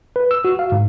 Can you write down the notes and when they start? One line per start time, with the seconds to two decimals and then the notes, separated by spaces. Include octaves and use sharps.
0.16 B4
0.31 E6
0.45 F#4
0.59 F5
0.72 G#2